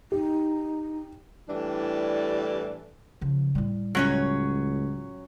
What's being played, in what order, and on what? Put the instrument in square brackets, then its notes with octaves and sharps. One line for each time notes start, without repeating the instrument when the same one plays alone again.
[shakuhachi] D#4 [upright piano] G4
[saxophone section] A2 E3 G3 D4
[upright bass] C#3 F3
A2 G3
[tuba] C#2 [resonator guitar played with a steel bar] F#3 C#4 C#5